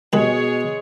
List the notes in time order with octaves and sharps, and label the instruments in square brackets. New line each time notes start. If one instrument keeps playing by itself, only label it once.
[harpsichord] C2 B4 [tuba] B2 [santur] G#3 [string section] G#4 C#5